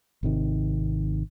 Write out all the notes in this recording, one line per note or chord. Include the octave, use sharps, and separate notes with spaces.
G#1 C3 D#3